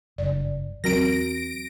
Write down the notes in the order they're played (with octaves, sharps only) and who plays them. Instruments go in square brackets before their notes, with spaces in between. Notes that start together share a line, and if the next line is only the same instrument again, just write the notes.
[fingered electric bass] F#1 G2 [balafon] D5
[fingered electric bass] E2 F#3 [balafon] C4 F#4 A#4 [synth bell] A#6 D7